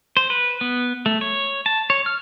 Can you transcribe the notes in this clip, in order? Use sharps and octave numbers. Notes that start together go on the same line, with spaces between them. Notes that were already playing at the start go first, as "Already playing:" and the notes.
C5
B4
B3
A3
C#5
A5
C#5
F6